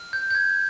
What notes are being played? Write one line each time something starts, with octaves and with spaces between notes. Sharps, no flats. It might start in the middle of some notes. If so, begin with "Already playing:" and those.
Already playing: F6
G6
G6
F6 G#6